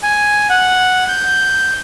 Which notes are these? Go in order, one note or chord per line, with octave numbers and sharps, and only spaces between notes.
G#5
F#5
G6